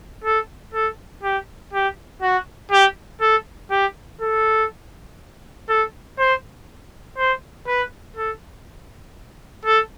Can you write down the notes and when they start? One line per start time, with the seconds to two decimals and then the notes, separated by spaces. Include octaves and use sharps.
0.24 A4
0.74 A4
1.23 G4
1.73 G4
2.22 F#4
2.72 G4
3.21 A4
3.71 G4
4.21 A4
5.69 A4
6.19 C5
7.18 C5
7.67 B4
8.17 A4
9.65 A4